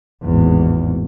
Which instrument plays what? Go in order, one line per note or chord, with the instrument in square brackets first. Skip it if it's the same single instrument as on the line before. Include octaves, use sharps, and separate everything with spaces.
[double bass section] G#1 E2 A2